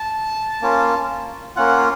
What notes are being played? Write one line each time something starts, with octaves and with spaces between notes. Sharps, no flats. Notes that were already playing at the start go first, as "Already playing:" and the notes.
Already playing: A5
A#3 C#4 F4
A#3 C#4 F4 F#5